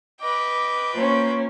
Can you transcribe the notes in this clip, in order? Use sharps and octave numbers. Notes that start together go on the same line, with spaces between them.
B4 D#5 G5 D6
A#3 C#4 F4 C5